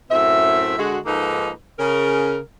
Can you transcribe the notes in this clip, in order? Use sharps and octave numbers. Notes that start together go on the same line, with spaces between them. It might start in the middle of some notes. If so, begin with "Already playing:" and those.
F#2 A2 C4 E5
D3 G#3 F#4
G#2 F3 A#3 D#4 A4 B4
C#3 A#4